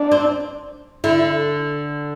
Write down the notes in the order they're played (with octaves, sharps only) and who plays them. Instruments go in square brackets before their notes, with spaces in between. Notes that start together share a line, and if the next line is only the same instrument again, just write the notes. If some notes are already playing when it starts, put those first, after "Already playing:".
Already playing: [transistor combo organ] D4
[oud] C4
[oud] D3 [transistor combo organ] E4